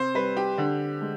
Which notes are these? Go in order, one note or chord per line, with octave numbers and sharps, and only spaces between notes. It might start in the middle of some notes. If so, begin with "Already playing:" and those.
Already playing: C3 C5
G3 B4
G4
D3
G#3